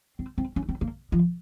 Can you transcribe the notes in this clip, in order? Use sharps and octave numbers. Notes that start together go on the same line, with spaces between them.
C4
C4
C#4
C4
A#3
F3